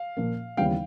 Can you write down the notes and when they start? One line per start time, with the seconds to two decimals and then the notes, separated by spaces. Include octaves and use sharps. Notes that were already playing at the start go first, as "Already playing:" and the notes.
Already playing: F5
0.17 A#2 F3 A#3
0.57 D#2 C#3 E3 G3 B3 F5 G5